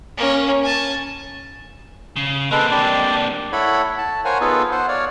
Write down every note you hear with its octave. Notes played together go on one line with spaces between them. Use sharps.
A#3 C#4
G#5 A5
C#3
G#3 A#3 C4 A4 B4
D4 G4 D5
E4 A4 C#5 F#5 B5
A5
A#4 C5 C#5 F5 F#5 G#5
B3 D#4 F4 G#4 A4 B4
C5 F#5
C#5 D5 F5